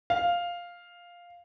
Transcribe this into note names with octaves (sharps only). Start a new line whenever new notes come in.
F5